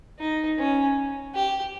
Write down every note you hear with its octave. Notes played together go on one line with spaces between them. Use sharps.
D#4
C#4
G4